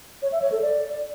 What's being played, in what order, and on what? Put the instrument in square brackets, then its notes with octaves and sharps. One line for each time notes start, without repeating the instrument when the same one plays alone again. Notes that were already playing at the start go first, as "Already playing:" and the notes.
[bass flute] C#5
E5
C#5
A4
D5